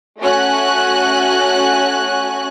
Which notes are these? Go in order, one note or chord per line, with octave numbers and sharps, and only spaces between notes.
A3 C#4 F#4 G#5 F#6